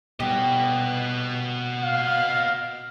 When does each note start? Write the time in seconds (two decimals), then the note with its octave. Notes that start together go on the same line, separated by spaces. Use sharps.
0.20 B2 G3 F#4 G4 D#5
1.82 F5